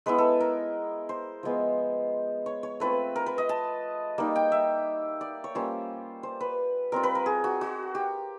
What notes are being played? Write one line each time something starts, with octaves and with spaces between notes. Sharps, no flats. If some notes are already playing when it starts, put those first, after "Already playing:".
G#3 B3 E4 B4
A4
A#4
C5
F3 G#3 B3
C#5
C#5
A3 C4 F4 B4
A#4
B4
D#5
A5
G3 A#3 D#4
G5
E5
D5
C#5
G3 A#3 C#4 F4 C5
C5
B4
G3 C4 F4 A#4
B4
A#4
G#4
F#4
F#4
G4